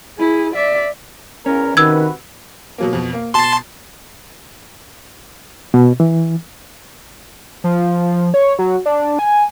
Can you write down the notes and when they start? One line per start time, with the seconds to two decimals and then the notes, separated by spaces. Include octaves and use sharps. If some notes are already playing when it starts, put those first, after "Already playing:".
0.19 E4 G#4
0.54 D5 E5
1.46 E2 C#4 A#4
1.77 C3 D#3 F#4 B4 E6 G#6
2.78 B2 F#3 A#3
2.93 F2 B2
3.13 A#3
3.34 B2 A5 C6
5.74 B2
6.00 E3
7.64 F3
8.34 C#5
8.59 F#3
8.86 D4
9.19 G#5